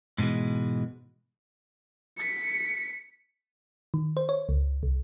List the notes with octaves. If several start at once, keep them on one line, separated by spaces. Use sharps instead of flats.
G#2 B2 D3 E3 G#3
B6 C#7
D#3
C5
C#5
C#2
C2